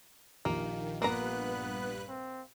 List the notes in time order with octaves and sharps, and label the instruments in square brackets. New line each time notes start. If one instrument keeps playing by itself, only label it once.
[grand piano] A#1 A#2 G4 [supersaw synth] D#3 [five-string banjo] A#3
[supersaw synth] G2 B4 F#6 [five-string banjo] A#3 A#5 [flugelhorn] B3
[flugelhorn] C4